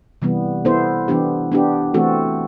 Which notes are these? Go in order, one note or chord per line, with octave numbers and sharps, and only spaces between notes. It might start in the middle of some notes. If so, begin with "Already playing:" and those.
C3 E3 G3 B3
B3 E4 A4 C5
E3 B3 D4 G4
B3 D4 G4
E3 A3 C4 F#4 A4